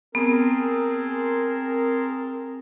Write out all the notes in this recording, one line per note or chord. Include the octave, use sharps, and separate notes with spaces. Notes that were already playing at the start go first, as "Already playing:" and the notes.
B3 C4 G#4 A#4 A5 C6